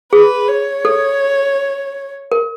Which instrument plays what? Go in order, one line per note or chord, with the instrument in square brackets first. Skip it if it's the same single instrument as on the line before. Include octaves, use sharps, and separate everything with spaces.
[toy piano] G#4 [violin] B4
[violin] C#5
[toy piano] A4
A#4